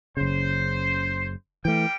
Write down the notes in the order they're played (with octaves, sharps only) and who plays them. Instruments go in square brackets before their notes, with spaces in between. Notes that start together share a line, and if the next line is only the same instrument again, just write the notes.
[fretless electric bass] F#1 C#3 [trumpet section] C5
[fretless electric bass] E3 A3 [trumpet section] G3 A#3 G5